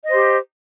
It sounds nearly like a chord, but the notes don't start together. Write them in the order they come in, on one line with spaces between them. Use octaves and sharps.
D#5 C5 G4